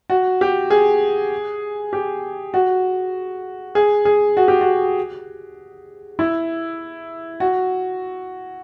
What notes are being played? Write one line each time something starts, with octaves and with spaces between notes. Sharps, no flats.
F#4
G4
G#4
G4
F#4
G#4
G#4
F#4
G4
F#4
E4
F#4